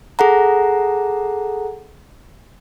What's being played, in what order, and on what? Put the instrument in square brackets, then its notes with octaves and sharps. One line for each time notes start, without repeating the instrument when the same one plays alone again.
[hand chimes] G#4 A4 F#5 A#5